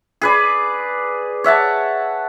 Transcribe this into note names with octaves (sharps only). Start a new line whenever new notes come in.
G#4 B4 D5
C#5 E5 F#5 A5